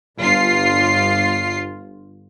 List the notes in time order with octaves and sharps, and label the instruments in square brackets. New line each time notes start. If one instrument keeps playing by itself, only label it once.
[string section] G1 F4 C7